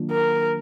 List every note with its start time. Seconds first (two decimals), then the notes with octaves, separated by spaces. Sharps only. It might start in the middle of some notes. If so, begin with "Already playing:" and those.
Already playing: D#3 F#3 A#3 D4 F4
0.12 A#4